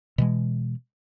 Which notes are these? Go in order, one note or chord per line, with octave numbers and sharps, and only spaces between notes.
B2 E3 G#3